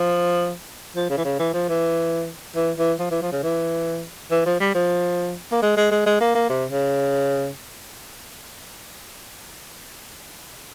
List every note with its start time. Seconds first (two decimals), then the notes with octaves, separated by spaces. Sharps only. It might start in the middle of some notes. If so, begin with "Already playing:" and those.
Already playing: F3
0.96 F3
1.10 C#3
1.18 E3
1.25 C#3
1.39 E3
1.54 F3
1.68 E3
2.56 E3
2.78 E3
2.99 F3
3.11 E3
3.22 F3
3.32 C#3
3.43 E3
4.31 E3
4.45 F3
4.60 G3
4.74 F3
5.52 A#3
5.62 G#3
5.77 G#3
5.91 G#3
6.06 G#3
6.21 A#3
6.35 A#3
6.49 C3
6.71 C#3